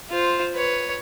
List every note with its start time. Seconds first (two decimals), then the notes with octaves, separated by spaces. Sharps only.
0.11 F4 C5
0.54 B4 C#5